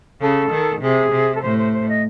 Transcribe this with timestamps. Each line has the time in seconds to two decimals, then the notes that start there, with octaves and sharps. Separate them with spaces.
0.21 C#3 A4
0.51 D#3
0.82 C3 G#4
1.12 C3
1.35 A4
1.42 A2 C5
1.58 C5
1.73 C5
1.88 D#5